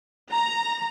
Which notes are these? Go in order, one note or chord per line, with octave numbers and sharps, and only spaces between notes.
A#5